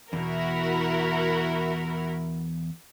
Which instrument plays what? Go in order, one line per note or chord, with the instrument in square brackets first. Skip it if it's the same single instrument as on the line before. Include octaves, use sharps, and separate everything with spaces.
[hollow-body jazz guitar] E2 B2 [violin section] E4 F#4 A#4